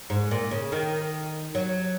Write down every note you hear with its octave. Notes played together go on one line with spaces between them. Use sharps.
G#2
A#2
C#3
D#3
F#3